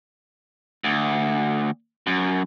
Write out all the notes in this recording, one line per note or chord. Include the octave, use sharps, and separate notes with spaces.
D2
F#2